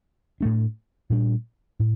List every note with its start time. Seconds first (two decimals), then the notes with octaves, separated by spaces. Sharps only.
0.41 A2 A3 D4
1.10 A#2 G3 D4
1.79 A2